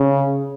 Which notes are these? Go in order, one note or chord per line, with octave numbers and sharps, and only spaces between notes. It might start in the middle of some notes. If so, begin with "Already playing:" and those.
Already playing: C#3